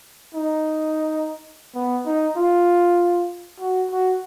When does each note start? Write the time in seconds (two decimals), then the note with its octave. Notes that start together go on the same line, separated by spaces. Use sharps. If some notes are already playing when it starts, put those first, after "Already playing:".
0.34 D#4
1.75 B3
2.06 D#4
2.36 F4
3.60 F#4
3.91 F#4